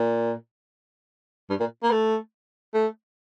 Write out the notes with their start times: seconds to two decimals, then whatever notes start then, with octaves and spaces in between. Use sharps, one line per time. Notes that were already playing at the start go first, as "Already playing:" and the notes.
Already playing: A#2
1.50 G2
1.60 A#2
1.83 A#3
1.91 A3
2.74 A3